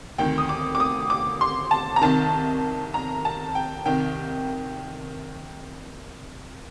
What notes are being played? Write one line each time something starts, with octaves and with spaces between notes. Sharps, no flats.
D2 C3 D#3 G5
D#6
D6
D6
D#6
D6
C6
A5
A#5
C2 C3 D#3 A5
A#5
A5
G5
C2 C3 D#3 G5